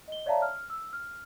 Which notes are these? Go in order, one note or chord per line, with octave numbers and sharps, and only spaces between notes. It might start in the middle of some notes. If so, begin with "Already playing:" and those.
D#5 G7
C#5 D5 E5 F5 A5 A#5
F6
E6
F6